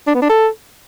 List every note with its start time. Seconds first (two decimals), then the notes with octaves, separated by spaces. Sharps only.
0.07 D4
0.15 B3
0.22 D4
0.29 A4